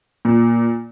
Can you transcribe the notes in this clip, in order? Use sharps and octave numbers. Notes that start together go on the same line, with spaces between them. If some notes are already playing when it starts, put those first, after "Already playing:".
A#2